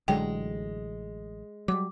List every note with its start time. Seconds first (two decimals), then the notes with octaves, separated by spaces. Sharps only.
0.08 A1 D3 F#3 G#3 G5
1.68 F#3 G3 D6